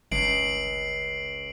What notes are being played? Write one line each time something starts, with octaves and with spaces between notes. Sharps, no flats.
G1 C#2 C7 D7 F#7